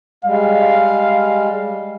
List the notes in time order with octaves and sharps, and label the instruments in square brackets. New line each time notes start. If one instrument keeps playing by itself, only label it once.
[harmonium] G3 G#3 [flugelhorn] F5